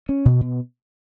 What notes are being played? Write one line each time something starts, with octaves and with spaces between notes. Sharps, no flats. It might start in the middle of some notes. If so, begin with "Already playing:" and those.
C#4
B2
B2